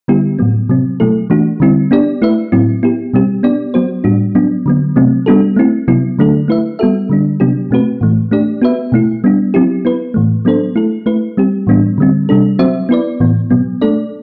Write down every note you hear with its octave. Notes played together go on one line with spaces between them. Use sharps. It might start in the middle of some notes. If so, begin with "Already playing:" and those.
D3 G3 B3 E4 G4
A2 F#3 B3
C3 F#3 C4
B2 F#3 A3 E4 A4
E3 A3 D4 F#4
D3 G3 C4 E4
B3 D4 G4 D5
A3 E4 B4 E5
A2 F#3 C4 E4
B3 E4 G4
B2 G3 C4 G4
B3 D4 G4 D5
F#3 B3 F#4 C5
A2 G3 D4 F#4
F#3 B3 D4
D3 F#3 B3
C3 F#3 A3 C4
G3 B3 D4 F#4 A4
A3 C4 E4
C3 F#3 B3 E4
D3 F#3 A3 D4 A4
A3 E4 B4 E5
G3 B3 F#4 A4 E5
D3 G3 D4
C3 F#3 B3 D4 G4
B2 A3 C4 F#4 B4
A2 E3 A3
A3 D4 G4 D5
B3 F#4 B4 E5
B2 A3 E4
G3 B3 D4
F#3 C4 E4 G4
B3 E4 B4
A2 E3 A3
F#3 B3 D4 A4 C5
A3 E4 A4
A3 E4 B4
G3 C4 G4
A2 E3 G3 B3 D4
D3 G3 C4
C3 G3 D4 A4
F#3 C4 F#4 C5 E5
B3 E4 B4 D5
A2 E3 B3
B2 F#3 B3
A3 D4 A4 D5